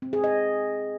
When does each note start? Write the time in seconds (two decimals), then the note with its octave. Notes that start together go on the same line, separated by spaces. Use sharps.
0.02 C4
0.13 G#4
0.24 D#5